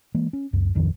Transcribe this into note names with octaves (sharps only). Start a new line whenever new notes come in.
E3 G#3 A#3
C#4
C#2 F#2
D1 A#1 F2 D#3